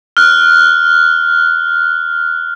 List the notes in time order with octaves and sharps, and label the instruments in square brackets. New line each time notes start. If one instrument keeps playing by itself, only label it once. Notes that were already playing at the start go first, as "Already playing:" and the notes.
[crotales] F6 F#6